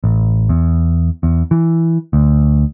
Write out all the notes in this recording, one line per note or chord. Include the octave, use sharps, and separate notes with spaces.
A1
E2
E2
E3
D2